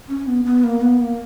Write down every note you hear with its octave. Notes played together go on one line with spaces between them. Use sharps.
C#4
B3
B3
A#3
B3
A#3